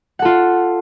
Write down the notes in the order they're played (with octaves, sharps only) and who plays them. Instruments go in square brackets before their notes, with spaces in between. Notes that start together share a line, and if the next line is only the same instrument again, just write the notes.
[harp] F#5
A4
F4